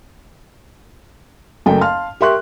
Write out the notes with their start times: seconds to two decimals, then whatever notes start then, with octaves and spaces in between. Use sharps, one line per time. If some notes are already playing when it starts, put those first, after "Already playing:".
1.66 F#1 F#2 A3 G5
1.81 F5 A5 C6 F6
2.21 G4 A#4 E5 C6 C#6 F#6